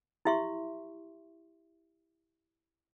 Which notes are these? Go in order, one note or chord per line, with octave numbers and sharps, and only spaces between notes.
E4 G4 E5 C6 C#6